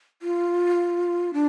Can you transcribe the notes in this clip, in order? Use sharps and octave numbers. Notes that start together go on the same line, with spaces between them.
F4
D4